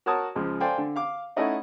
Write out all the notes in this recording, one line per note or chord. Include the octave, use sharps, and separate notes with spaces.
F#4 A#4 C#5 A5 D#6
C#2 F3 G#3
A4 C5 D5 F5 G5 G#5
D3
F5 D6
A3 C#4 D#4 E4 D#5 F#5